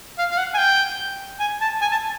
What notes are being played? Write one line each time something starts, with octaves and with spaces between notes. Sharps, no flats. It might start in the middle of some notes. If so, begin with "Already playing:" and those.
F5
F5
F#5
G#5
G5
G#5
A5
G#5
A5